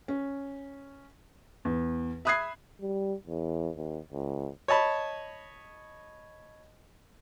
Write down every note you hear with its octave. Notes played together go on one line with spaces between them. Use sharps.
C#4
E2
E5 B5 D#6 F#6 G#6 C7
G3
E2
D#2
C#2
C#5 D#5 A5 B5